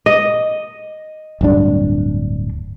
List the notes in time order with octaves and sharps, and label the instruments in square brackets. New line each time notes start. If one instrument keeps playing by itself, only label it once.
[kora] D#5
[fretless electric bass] D1 G2 D4